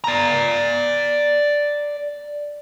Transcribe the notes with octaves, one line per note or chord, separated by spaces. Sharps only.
D5 A#5